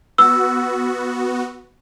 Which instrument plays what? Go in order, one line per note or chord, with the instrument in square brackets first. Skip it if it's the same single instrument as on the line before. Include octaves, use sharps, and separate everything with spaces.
[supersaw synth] B3 F#4 [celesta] E6